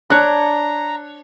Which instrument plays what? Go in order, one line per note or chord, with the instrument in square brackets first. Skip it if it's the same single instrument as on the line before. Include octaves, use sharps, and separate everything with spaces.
[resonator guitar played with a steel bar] D4 C#5 [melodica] A#5 [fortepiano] F#6